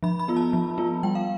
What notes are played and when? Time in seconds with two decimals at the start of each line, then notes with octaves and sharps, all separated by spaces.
0.03 F3 B5
0.19 B5
0.28 B3 F4
0.37 A5
0.53 F3
0.78 B3 F4
1.03 G3 G5
1.15 F5